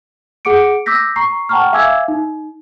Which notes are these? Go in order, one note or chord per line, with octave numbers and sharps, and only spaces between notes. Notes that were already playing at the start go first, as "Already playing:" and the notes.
G#4 F#5 D6 C#7 D7
D6 E6 G6 A#6 B6
A#5 C#6 C7
F#5 G5 A5 A#5 C#6 F6
E5 F5 G#5 D6 E6 G#6
D#4